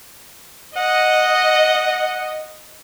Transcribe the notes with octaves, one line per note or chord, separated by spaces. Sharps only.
D#5 F#5